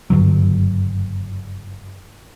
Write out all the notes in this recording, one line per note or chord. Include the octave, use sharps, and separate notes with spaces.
F#1 G2 D3 F#3